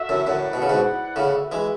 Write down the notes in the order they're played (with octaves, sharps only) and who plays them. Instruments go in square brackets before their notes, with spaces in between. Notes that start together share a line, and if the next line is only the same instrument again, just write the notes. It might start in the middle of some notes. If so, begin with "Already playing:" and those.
Already playing: [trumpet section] F#4 A4 E5
[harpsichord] F#2 A2
[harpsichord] F#2 A2 [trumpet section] E4 B4 D5 F#5
[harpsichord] B2
C#3
G#2 B2
A2 C#3
[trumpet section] F#4 B4 E5
[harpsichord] E3 G#3